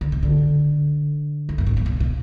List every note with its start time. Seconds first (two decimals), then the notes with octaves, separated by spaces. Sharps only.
0.01 D3
0.12 B2
0.23 D3
1.49 F2
1.58 F#2
1.66 G#2
1.77 A#2
1.86 B2
2.00 B2